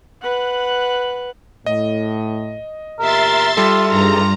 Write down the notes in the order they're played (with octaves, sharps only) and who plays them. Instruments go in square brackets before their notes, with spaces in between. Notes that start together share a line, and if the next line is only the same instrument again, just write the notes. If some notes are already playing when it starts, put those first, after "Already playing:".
[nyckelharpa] B4 F#5
[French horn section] A2 [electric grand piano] D#5
[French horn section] E2 A#2 G4 [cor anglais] A#4 [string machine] E5 C6 A6
[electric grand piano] G3 A4 [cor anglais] F4
[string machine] G2 A#5 [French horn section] D#3 G#4 [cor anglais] F4